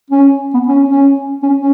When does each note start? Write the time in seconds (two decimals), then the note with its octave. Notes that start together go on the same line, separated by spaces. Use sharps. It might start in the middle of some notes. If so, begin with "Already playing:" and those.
0.10 C#4
0.54 B3
0.68 C#4
0.89 C#4
1.43 C#4
1.58 C#4